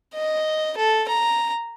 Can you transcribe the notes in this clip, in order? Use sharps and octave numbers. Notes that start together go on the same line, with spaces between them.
D#5
A4
A#5